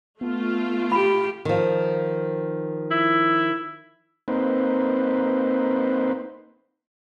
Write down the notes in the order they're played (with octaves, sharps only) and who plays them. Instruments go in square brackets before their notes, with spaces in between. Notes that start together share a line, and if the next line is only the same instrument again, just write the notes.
[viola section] A3 F4 [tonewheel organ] B3
[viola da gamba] G4 [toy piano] B5
[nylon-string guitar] D#3 F3
[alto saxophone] E4
[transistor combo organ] A#3 C4 D#4 B4 C5